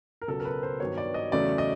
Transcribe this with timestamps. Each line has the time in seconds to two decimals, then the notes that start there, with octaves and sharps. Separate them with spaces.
0.22 A#4
0.28 C#2 B2 F#3 A4
0.40 A#4
0.45 B4
0.63 C5
0.80 G2 D#3 F#3 B3 C#5
0.98 D5
1.14 D#5
1.32 E2 C#3 F#3 A3 C#4 D5
1.58 D#5